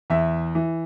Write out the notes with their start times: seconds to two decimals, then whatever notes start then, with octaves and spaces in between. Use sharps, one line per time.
0.10 E2 E5
0.55 E3